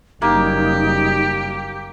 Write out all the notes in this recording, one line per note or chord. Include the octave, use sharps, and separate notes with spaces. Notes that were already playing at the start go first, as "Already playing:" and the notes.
F#1 G3 A#3 D#4 G4